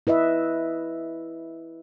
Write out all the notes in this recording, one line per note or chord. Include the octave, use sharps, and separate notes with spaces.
E4 B4 D#5 E5